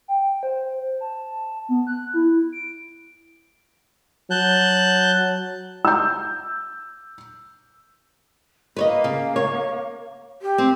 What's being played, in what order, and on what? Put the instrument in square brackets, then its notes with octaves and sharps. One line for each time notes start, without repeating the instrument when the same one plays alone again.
[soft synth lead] G5
C5
A5
B3
F#6
E4
D7
[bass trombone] F#3 [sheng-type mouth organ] A5 F#6 G6
[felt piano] E6 G6
[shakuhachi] A#3 [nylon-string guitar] B4 C#5 D#5
[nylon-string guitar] C#3
C#5
[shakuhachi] G4
[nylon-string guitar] C4